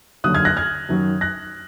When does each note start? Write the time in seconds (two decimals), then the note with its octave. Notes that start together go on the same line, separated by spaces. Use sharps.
0.24 D#2 D3 F#3 D#6 F#6
0.34 F6 G#6
0.45 F#6 A#6
0.57 F6 G#6
0.89 F#2 D#3 F#3
1.21 F#6 A#6